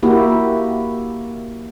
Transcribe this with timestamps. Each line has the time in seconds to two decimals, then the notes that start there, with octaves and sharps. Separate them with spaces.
0.03 A#3 E4 F#4 G4